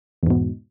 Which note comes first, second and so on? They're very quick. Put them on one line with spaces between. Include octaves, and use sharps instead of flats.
E2 G#2 B2